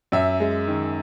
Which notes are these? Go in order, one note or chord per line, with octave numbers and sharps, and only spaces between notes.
F#2 E5
G#3
D#3